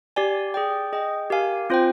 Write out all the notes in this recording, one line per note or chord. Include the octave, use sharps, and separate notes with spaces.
G4 D5 G#5
G#4 D5 G5
G#4 D#5 G5
G4 A#4 F5 G#5
C4 F4 C5 G5